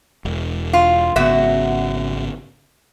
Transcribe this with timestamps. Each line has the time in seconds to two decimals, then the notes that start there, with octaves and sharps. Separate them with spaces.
0.25 E1
0.73 F4
1.16 G#1 F#2 C#3 B3 F#4 E5